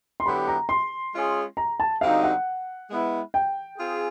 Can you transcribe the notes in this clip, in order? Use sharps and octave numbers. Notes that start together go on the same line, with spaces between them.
C6
D3 F#3 B3 E4 G4 B5
A#5
C6
G#3 C#4 F4 G#4
A#5
A5
D3 G3 C4 D#4 F#4 F5
F#5
G#3 B3 E4
G5
C4 F4 G#4